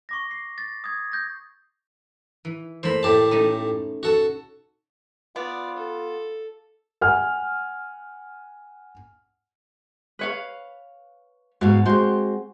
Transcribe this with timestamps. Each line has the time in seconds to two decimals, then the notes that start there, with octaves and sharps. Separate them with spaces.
0.09 C#6 D6 A#6
0.31 C7
0.58 A6
0.84 D#6 G#6
1.12 G6 A#6
2.45 E3
2.83 E3 A3 A#3 C5 B5
3.03 A2 G4 A5
3.31 A3 C#4 D#4
4.03 F#4 A4
5.36 B3 F4 D5
5.77 A4
7.01 F#5 G#5 F6
10.19 B4 C#5 F5
11.61 G#2 B2 F#4 F5
11.86 G#3 C4 F#4 C5